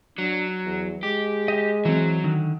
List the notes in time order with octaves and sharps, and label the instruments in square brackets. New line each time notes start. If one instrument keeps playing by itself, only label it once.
[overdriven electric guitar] F#3 [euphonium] D4
[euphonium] E2
[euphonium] G#3 [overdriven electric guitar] G4
[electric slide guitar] D#5
[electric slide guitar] E3 C4 [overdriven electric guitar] F#3
[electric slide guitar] D3 D#3